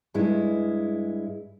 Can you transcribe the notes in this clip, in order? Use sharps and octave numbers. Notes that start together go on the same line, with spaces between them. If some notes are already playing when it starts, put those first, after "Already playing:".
G2 G#3 E4